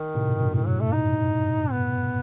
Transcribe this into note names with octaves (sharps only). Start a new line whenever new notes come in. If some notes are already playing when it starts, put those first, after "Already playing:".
Already playing: D#3
A2 C3
G2 B2
G2 B2
F#2 A2 D#3
F#3
A3
D#4
B3